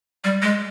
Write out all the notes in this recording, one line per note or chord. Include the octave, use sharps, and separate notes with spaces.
G3
G#3